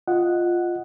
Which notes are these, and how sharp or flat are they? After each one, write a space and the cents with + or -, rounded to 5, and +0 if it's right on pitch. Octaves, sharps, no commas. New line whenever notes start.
F4 +0 D#5 +0 F#5 +0